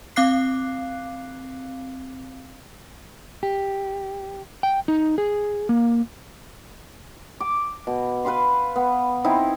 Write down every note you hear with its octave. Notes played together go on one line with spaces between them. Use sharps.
C4 F5 D6 F#6 C7
G4
G5
D#4
G#4
A#3
D6
B2
B4 F5 B5 C6
B3
C4 D#4 E4